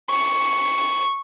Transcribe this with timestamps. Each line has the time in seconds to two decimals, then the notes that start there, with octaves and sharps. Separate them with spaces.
0.10 C#6